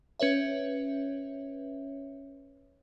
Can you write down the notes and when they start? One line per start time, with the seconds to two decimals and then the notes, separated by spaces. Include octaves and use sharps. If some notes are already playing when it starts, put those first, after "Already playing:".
0.20 C#4 B4 C#5 E5